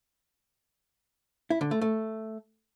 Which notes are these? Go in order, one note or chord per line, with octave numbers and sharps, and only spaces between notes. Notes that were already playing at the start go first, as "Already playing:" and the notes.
E4
D3
A3
A3